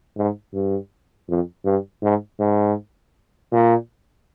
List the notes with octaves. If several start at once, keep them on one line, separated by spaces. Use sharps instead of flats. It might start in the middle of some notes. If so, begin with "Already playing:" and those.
G#2
G2
F2
G2
G#2
G#2
A#2